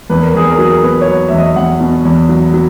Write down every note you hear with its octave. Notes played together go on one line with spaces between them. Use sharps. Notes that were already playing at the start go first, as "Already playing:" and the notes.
E2 B4
A#4
E2 G#4
A#4
F#3 G#4
A#4
B2 B4
C#5
F#3
E2 E5
D#5
E2 F#5
B2
E2
F#3
F#3